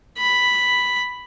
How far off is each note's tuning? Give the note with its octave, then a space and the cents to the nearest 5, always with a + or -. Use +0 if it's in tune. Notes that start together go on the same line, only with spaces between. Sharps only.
B5 +0